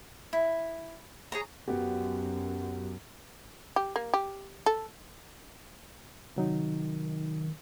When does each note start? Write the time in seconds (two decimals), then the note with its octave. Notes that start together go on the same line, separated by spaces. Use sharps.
0.33 E4
1.32 G#4 C#5 A#5
1.68 F#2 B3 F#4 G4
3.76 G4
3.96 A#3
4.14 G4
4.66 A4
6.36 C3 D#3 F#3 D#4